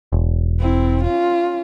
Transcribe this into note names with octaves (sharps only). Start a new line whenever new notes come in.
E1
C4 E4
C#4 F4